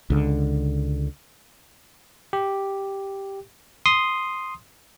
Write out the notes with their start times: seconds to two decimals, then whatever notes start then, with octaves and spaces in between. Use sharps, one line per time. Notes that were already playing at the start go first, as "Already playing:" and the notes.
0.10 C#2 D3
2.33 G4
3.86 C6 D#6